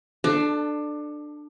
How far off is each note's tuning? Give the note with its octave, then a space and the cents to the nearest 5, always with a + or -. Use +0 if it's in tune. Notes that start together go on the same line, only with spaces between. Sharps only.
D4 +20 A4 +0